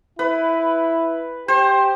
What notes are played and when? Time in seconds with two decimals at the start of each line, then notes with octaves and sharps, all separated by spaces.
0.19 E4 B4
1.48 G4 C5